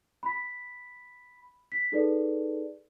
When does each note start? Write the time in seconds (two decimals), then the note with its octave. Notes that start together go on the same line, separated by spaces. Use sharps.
0.23 B5 B6
1.72 B6
1.92 D#4 G#4 A4 B4 D5